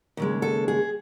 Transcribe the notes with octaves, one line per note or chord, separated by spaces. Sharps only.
D#2 C#3 G#3
A4
G#4